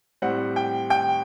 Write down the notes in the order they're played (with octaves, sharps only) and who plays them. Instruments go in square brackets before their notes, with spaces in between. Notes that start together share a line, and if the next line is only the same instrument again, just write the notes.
[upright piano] A2 G3 C4 F#5
G5
G5